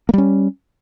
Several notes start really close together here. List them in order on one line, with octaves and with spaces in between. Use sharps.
A#3 G3 C#4